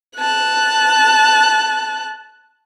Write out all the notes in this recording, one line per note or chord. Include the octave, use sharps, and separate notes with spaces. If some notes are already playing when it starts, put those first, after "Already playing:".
A5 F#6